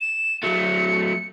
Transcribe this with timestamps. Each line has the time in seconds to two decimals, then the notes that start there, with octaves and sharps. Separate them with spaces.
0.01 E7
0.43 F#3 A3 C#7